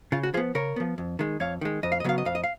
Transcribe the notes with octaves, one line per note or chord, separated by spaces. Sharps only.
C#3 F4
F#4
F3 B3 F4 G#4
C#3 A#4 C#5
F3 B3
F2
D#3 G#3
F2 C#5 F5
D#3 G#3
F2 D#5
F5
D#5
C#3 F#3 B3 F5
D#5
F2 F5
D#5
F5